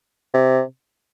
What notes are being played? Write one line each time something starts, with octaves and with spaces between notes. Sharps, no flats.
C3